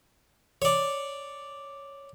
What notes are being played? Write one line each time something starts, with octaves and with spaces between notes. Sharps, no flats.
C#5 D5